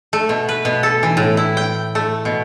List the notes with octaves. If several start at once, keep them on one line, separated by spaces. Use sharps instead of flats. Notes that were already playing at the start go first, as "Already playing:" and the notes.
A3
B2
B4
B2
A4
E3
A2
E4
G5
A3
B2